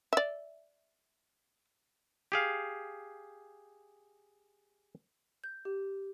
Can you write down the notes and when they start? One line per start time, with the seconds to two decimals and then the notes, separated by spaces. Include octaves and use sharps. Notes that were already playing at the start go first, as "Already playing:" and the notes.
0.13 D5 E5
2.32 G4 G#4 F5
5.44 G6
5.65 G4